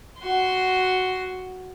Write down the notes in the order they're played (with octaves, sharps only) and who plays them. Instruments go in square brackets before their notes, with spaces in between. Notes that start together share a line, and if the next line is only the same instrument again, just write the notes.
[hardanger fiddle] F#4 C6